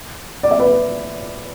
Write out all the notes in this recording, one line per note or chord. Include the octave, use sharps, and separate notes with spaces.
D5
E5
B4 D5